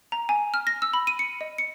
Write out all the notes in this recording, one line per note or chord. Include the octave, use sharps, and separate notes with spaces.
A#5
G#5
F6
A#6
E6
B5
D#7
C#7
D#5
C#7